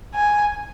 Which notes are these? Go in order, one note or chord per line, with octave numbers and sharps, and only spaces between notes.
G#5